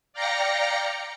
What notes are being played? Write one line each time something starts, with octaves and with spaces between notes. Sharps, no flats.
D5 F5 G5 A#5 A#6 C#7